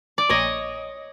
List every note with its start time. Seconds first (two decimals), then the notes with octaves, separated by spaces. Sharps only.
0.18 D5
0.29 A#1 C#5 D#5